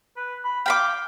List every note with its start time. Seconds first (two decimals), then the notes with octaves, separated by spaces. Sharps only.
0.17 B4
0.45 B5
0.66 F5 G5 B5 D6